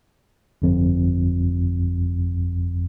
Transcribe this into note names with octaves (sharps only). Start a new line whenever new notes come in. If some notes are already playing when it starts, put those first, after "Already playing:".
G1 F2